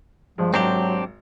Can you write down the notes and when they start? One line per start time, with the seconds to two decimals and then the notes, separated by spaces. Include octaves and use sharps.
0.38 G2 F3 G#3
0.54 G#1 F#3 C4 D4 G4 A#5